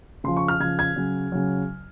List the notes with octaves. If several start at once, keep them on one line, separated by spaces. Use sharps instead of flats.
C#3 F3 C6
C#6
F6
C#3 F3 G#6
G#6
C#3 F#3
C#3 F#3